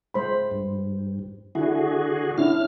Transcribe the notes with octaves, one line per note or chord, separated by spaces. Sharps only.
G#3 C5 B5
G2
D3 E4 F#4 G#4
C#4 D4 E4 F6